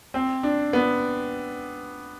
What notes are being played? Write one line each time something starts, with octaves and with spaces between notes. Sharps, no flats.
C4
D4
B3